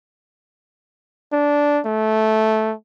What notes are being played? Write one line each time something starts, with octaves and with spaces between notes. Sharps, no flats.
D4
A3